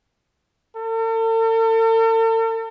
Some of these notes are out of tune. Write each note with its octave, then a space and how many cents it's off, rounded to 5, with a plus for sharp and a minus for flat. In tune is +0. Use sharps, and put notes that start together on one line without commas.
A4 +45